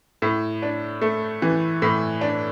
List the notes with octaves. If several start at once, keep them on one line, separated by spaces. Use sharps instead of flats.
A2
D4
A3
E3
A2
D4